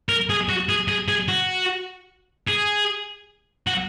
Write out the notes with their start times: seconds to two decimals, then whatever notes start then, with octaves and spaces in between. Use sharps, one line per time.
0.09 A#4
0.30 G#4
0.49 F#4
0.69 G#4
0.88 G#4
1.08 G#4
1.28 F#4
2.48 G#4
3.67 F#4